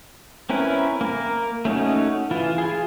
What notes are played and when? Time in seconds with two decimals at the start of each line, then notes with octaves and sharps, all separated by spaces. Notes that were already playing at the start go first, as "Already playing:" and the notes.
0.49 C4 C#4 E4 A#4 B4
1.01 A#3 A#4
1.65 A3 C#4 D#4 F#4
2.31 E3 E4 F4
2.58 F4 G#4